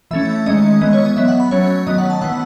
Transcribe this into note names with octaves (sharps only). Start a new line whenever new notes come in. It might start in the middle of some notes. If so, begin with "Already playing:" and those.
E3 A3 C#4 E5
D#3 G#3 C#4 D#5
E3 G#3 B3 D#5
C#5
D#5
F#3 B3 E5
F#5
B5
F#3 A3 C#4 C#5
D#3 F#3 B3 D#5
F#5
A5
E3 B3 F#5